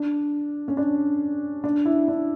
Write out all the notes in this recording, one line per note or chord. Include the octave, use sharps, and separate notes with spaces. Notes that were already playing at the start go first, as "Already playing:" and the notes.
Already playing: D4
C#4
D4
D4
E4
D4